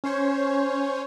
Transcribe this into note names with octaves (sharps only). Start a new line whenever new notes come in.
C#4 C5 C#5